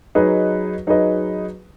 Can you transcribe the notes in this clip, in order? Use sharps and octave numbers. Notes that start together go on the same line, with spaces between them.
F#3 D#4 G#4 B4 D#5
F#3 D#4 G#4 B4 D#5